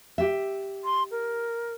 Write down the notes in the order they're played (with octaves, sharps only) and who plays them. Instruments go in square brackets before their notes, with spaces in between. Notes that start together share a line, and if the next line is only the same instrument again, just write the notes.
[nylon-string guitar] G4 E5
[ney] C6
A#4